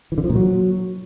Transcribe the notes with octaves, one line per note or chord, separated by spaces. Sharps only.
E3
D3
F3
A#2
F#3